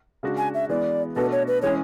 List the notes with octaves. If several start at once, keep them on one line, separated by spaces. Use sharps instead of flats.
C#3 G#3 D4 F#4
G#5
E5
E3 G#3 B3 D5
B2 A3 D4 F#4 A4 B4
C#5
B4
E3 G#3 C#4 G#4 C#5